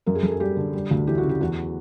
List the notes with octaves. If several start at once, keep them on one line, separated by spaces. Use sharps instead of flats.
F#2 A#4
G#4
F#2 A4
G#4
G3 G4
D3
G3
D2
E3 G4
F#4
C#3
G4
E2 F#4